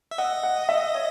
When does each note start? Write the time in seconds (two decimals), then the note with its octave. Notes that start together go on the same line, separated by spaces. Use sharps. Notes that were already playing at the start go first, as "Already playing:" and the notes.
0.11 E5
0.18 D#5 F#5
0.43 F#5
0.69 E5
0.95 C#5